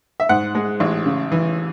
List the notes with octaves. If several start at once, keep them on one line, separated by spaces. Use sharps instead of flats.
E5
G#2 F#5
G#3
A1
C#3
E3